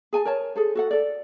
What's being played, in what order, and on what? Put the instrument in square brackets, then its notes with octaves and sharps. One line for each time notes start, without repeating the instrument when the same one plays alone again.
[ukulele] G#4 G#5 A5
A#4 C#5 A5
G#4 A4 C5
F#4 A4 F#5
A4 D5